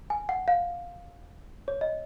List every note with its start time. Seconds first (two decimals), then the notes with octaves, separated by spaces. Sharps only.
0.10 G#5
0.29 F#5
0.48 F5
1.68 C#5
1.81 D#5